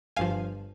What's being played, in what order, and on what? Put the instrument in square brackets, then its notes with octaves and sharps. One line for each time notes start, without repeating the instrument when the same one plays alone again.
[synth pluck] G1 G2 F3 F5 G#5